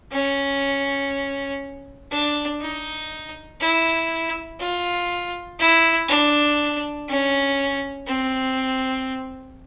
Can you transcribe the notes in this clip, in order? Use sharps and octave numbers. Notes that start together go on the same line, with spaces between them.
C#4
D4
D#4
E4
F4
E4
D4
C#4
C4